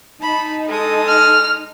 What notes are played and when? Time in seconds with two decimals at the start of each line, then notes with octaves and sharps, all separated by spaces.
0.22 D#4 A5 B5
0.69 G#3 A4 D#6
1.08 F6